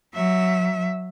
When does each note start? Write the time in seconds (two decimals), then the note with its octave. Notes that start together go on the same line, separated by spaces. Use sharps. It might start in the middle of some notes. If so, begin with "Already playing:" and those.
0.14 F#3 E5